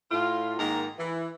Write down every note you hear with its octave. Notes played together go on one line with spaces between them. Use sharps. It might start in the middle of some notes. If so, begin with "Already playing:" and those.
A2 F4
G#2 D#3 G#3 A#3 A#5
E3